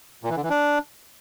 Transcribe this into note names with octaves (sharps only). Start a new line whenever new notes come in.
A#2
E3
D3
E3
D4